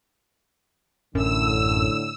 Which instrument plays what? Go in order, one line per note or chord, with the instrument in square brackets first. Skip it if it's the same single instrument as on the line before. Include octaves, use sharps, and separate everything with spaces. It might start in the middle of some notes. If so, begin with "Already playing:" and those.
[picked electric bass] A1 [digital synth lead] F#2 [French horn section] A2 D3 [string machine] E6